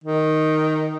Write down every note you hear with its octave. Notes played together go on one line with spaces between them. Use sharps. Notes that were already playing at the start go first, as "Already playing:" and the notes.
D#3